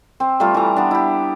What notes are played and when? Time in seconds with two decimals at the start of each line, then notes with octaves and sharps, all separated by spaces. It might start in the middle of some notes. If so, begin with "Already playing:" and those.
0.20 C4
0.40 G3 A3 F4 A4
0.54 E3 A#5
0.76 B3 D4
0.91 E4 G4